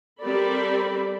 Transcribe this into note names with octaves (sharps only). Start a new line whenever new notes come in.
G3 C4 A4 A#4 D5 B5